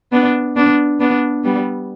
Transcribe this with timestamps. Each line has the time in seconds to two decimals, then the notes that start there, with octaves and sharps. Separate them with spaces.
0.12 B3 D4
0.56 B3 D4
1.00 B3 D4
1.44 G3 B3